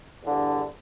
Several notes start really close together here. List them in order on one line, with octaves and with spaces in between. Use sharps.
E2 D3 G2